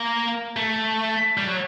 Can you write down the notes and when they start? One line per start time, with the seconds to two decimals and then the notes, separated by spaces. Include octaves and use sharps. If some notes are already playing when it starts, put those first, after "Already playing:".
Already playing: A#3
0.57 A3
1.38 G3
1.47 F#3